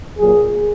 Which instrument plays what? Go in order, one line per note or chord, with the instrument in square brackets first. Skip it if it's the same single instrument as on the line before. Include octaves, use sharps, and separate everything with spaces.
[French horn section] A#2 F#3 A#3 G#4